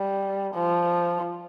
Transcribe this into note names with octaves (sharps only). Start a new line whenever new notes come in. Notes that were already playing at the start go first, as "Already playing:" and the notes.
Already playing: G3
F3